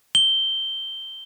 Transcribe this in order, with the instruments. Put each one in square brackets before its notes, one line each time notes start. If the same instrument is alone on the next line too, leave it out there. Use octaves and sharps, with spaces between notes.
[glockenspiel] G7